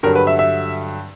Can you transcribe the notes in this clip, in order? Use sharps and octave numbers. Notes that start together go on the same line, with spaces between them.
G2 D3 F#3 A#4
B4
E5
E5